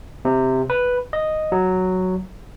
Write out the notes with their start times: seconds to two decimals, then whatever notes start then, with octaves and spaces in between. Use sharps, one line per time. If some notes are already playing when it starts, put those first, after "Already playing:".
0.25 C3
0.70 B4
1.13 D#5
1.52 F#3